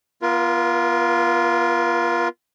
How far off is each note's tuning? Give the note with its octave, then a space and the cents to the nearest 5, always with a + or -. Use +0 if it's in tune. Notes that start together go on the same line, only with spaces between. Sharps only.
B3 -25 F4 -15 A#4 +35